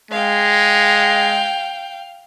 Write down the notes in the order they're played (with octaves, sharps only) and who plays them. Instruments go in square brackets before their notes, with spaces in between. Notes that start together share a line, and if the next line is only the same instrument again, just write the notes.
[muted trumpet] G#3 [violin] F5 G5